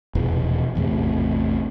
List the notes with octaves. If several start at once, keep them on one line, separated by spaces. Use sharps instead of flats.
F1 E2 B2 E3
A1 E2 A2 C3